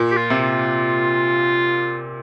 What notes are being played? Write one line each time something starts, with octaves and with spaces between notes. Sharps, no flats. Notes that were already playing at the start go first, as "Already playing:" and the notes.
Already playing: A#2
G4
F4
C3
F4